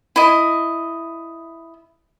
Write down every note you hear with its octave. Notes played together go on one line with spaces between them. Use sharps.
E4 D#5